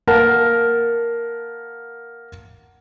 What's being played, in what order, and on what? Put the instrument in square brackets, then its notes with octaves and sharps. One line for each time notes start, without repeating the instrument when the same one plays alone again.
[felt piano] A#3 A#4 F5 F#5 A5